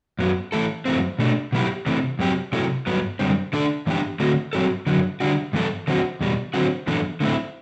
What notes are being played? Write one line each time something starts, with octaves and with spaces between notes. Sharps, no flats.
F#2 F#3 B3
E3 A3 E4 A4
F#2 E3 A3 C4
B2 A3 D4
B2 F#3 B3 E4 G4
C3 E3 A3
F#2 F#3 C4 G4
C3 F#3 A3 E4 A4
G2 F#3 B3
F#2 D3 G3 C4
D3 A3 D4 A4
G2 E3 B3 D4 G4
D3 A3 C4 F#4 A4
G2 F#3 C4 F#4 A4
F#2 D3 F#3
D3 G3 D4 F#4
G2 E3 B3 F#4 A4
E2 D3 F#3 C4 F#4
E2 B2 G3
D3 F#3 C4 F#4
F#2 E3 B3 D4 A4
D3 A3 C4 E4